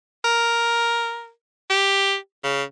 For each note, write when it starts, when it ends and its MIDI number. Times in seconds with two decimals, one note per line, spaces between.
0.25 1.30 70
1.70 2.16 67
2.44 2.63 49